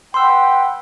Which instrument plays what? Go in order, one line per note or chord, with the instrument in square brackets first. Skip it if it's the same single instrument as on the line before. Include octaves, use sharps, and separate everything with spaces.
[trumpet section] B4 F#5 G5 [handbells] C6 E6